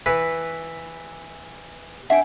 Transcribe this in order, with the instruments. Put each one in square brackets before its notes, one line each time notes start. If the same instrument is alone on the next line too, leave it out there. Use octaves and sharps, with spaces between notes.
[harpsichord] E3 B4
[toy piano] D4 F#5 [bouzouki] E5 G5